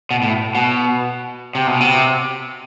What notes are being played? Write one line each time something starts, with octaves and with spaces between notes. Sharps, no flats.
B2
A2
B2
C3
B2
C3